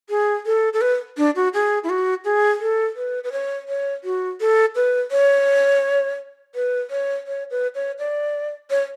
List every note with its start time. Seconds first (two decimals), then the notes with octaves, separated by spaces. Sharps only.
0.10 G#4
0.46 A4
0.73 A4
0.81 B4
1.18 D4
1.36 F#4
1.54 G#4
1.84 E4
1.89 F#4
2.25 G#4
2.61 A4
2.96 B4
3.24 B4
3.32 C#5
3.69 C#5
4.04 F#4
4.40 A4
4.75 B4
5.11 C#5
6.55 B4
6.91 C#5
7.27 C#5
7.51 B4
7.75 C#5
7.99 D5
8.70 C#5